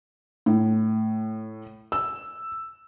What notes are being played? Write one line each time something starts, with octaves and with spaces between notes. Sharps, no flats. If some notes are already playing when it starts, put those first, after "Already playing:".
A2
E6